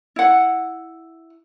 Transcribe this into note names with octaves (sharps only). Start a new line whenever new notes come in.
E4 F#5